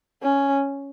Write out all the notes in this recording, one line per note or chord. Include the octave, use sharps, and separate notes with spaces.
C#4